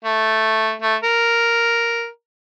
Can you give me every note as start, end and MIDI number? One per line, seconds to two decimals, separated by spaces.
0.05 0.73 57
0.82 0.96 57
1.03 2.08 70